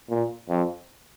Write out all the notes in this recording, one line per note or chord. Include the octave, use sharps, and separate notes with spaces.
A#2
F2